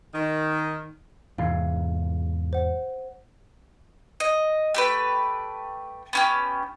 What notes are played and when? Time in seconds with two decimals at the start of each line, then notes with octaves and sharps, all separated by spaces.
0.13 D#3
1.38 E2 G#2 C3 F5
2.53 C5 F#5
4.20 D#5
4.74 A3 G4 B4
6.13 B3 C#4 G4